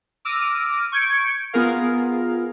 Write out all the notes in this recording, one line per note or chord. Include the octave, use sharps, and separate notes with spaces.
D6 E6 F6 A#6 D7 D#7
C#6 G6 G#6 C#7 D7
B3 F4 G#4 A#4 F5